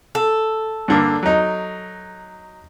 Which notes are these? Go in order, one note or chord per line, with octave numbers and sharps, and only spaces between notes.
A4
G2 D3 A#3
F#3 D#4